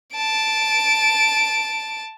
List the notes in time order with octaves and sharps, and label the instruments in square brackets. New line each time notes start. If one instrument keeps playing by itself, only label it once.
[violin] A5 D7